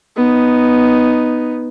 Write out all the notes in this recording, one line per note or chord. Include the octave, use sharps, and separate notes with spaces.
B3 D#4